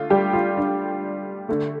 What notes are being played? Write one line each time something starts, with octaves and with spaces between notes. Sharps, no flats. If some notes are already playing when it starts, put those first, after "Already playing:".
Already playing: D3 A3 F4
G3 G4
F4
D4
D3 A3